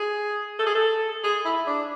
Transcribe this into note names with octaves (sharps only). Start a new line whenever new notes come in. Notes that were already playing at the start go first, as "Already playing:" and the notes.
Already playing: G#4
A4
G#4
A4
G#4
E4
D4